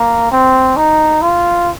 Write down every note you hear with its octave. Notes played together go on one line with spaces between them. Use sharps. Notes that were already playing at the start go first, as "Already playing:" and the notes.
Already playing: A#3
C4
D#4
F4